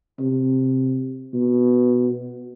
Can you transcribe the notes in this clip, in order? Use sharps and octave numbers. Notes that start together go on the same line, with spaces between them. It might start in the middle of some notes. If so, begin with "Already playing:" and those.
C3
B2